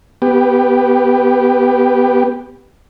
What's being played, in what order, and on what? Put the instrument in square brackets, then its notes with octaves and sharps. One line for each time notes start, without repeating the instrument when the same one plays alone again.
[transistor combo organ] B3 G4